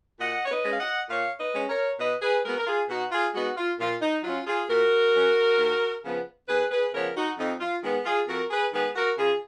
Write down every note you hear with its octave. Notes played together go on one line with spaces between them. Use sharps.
A#2 D#5 F#5
C#5
B4 D#5
G#3 C#4
F5
D#5 F#5
A#2 C#5 F5
B4 D#5
G#3 C#4
A#4 C#5
B2 B4 D#5
G#4 B4
G#3 B3 F#4 A#4
A#4
F4 G#4
B2 D#4 F#4
F4 G#4
G#3 B3 D#4 F#4
F4
A#2 F4
D#4
F#3 C#4 F4
F4 G#4
A#2 F#4 A#4
F#3 C#4
D#2
C#3 F3 B3
D#2 G#4 B4
G#4 B4
C#3 F3 B3 A#4 C#5
D#4 F#4
F2 D#4
F4
D#3 G#3 B3
F4 G#4
F2 F#4 A#4
G#4 B4
D#3 G#3 B3 G#4 B4
F#4 A#4
C#3 F4 G#4